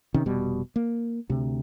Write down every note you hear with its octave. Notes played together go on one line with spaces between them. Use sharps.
C3 D#3 C#4
F1 B2 G3
A#3
D2 C3